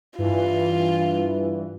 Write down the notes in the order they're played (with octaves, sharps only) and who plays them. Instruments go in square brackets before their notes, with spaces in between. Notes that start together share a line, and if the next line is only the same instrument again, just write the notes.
[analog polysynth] G2 E3 [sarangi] F4